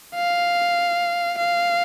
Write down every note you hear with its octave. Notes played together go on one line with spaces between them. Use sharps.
F5
F5